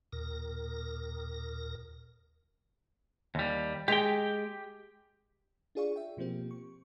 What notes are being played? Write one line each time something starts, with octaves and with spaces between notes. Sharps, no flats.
D#2 A#2 A#4
D#2 G3
G#3 G4 G5
D4 F4 G#4 D5 F5 C#6
E5 G5
B2 F3 A#3 C4 G4
C#6